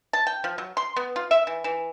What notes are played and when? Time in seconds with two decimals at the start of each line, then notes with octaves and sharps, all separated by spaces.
0.13 A5
0.27 G5
0.44 F3
0.58 F#3
0.77 C6
0.96 B3
1.16 F4
1.31 E5
1.47 E3
1.64 E3